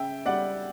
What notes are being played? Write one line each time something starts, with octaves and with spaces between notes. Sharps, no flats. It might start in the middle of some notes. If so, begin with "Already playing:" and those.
Already playing: C#3 E5 G5
G3 D5 F#5